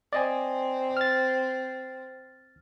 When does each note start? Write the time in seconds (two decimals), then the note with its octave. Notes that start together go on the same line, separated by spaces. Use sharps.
0.13 C4 D5 D#5 G#5
0.97 F6 A6